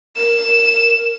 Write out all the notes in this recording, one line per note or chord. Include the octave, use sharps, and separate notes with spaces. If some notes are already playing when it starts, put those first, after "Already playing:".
A#4 E7